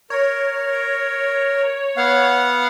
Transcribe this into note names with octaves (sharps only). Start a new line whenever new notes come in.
A#4 C#5
B3 F5 F#5